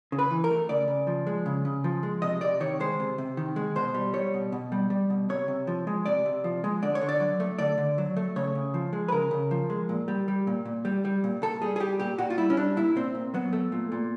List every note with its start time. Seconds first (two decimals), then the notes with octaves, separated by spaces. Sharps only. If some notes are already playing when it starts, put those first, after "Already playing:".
0.12 C#3
0.19 B4
0.31 E3
0.44 A#4
0.51 A3
0.69 C#3 D5
0.88 C#3
1.07 F3
1.27 G#3
1.46 C#3
1.65 C#3
1.84 F3
2.03 G#3
2.22 C3 D#5
2.41 C3 D5
2.60 D#3 C#5
2.80 G#3 C5
3.00 C3
3.18 C3
3.37 D#3
3.56 G#3
3.76 B2 C5
3.94 G3
4.14 G3 C#5
4.34 B2
4.52 B2
4.72 G3
4.90 G3
5.10 B2
5.29 C3 C#5
5.48 C3
5.67 F3
5.87 G#3
6.06 C3 D5
6.26 C3
6.44 F3
6.64 G#3
6.82 D3 D5
6.95 C#5
7.01 D3
7.09 D5
7.20 F#3
7.40 A3
7.59 D3 D5
7.78 D3
7.98 F#3
8.16 A3
8.36 C#3 C#5
8.55 C#3
8.74 F3
8.93 G#3
9.08 B4
9.12 C#3 A#4
9.31 C#3
9.51 F3
9.70 G#3
9.89 A#2
10.08 G3
10.28 G3
10.47 A#2
10.65 A#2
10.85 G3
11.05 G3
11.24 A#2
11.42 A#2 A4
11.62 G3 G#4
11.76 G#4
11.80 G3 G4
11.99 A#2 G4
12.18 A#2 F#4
12.30 F4
12.38 G3 E4
12.50 C#4
12.57 G3 D4
12.77 A#2 E4
12.96 A#2 C4
13.15 A#2
13.34 F#3 B3
13.53 A3
13.72 A#2
13.92 A#2